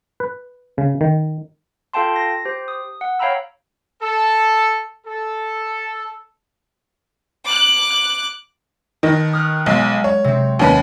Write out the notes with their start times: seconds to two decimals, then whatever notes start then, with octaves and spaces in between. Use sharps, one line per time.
0.20 B4
0.78 C#3
1.01 D#3
1.93 F4 A4 F5 G5 A5 C6
2.16 A#6
2.45 G4 C5
2.68 D#6
3.01 F#5
3.19 C#5 F5 G5 A#5 B5 E6
4.02 A4
5.07 A4
7.45 D6 F#6
9.03 D#3 B4 D#5 A5
9.33 D#6 F6 F#6
9.66 B1 F#3 G#3
10.04 C#5
10.24 C3 C4
10.59 D#2 C#4 B4